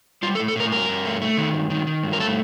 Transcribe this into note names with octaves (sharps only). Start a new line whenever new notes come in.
G3 F4
A4
A2
A4
A2 A#4
G2 A#4
G2
A3
A3
D#3
G2
D#3
D#3
G2
A#4
A3 A4